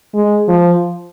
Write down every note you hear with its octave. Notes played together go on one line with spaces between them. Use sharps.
G#3
F3